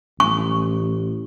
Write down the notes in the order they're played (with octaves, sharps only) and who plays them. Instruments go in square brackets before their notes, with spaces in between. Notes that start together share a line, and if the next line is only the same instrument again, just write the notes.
[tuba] A1 [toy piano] C#6